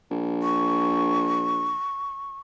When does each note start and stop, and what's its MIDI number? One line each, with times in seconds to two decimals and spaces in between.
0.11 1.75 34
0.43 2.38 85